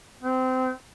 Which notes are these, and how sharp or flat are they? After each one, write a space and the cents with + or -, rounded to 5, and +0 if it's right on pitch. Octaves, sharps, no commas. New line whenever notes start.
C4 -25